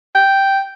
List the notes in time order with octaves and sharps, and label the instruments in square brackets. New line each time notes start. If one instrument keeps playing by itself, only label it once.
[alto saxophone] G5